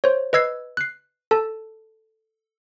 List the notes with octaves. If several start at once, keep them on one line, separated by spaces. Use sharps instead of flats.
C5 C#5
B4 D#5 E6 G#6 C7
F#6 C7
A4 A5